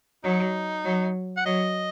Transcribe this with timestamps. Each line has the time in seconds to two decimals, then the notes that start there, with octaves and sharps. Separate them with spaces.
0.24 F#3 D#4
0.84 F#3
1.37 F#5
1.46 F#3 D#5